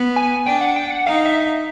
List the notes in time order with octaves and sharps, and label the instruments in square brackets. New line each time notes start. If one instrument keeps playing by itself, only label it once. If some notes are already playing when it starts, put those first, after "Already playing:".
Already playing: [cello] B3
[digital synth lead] G#5
[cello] D4 [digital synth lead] G5
[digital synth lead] F#5
G5
F#5
[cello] D#4 [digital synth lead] F5
[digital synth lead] E5